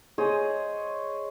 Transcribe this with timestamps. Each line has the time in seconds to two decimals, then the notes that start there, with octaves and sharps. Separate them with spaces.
0.18 G#4 C5 C#5 D#5